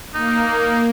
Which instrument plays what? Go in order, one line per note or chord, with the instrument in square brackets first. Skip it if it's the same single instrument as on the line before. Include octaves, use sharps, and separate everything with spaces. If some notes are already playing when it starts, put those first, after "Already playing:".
[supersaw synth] A#3 [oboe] D#4